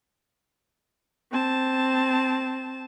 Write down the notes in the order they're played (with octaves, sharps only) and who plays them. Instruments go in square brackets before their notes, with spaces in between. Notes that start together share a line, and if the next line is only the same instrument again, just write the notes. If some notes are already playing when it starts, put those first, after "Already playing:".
[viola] C4 A5